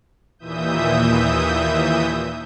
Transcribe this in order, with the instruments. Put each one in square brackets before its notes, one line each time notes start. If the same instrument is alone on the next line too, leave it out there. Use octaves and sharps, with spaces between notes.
[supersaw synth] D#2 A#2 E3 E5 D#6 G6